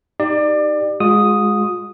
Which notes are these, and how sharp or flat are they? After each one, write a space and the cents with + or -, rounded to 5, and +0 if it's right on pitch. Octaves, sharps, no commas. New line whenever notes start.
D#4 +0 G4 +0 D5 +25
G#3 +0 F4 +45 D#6 +0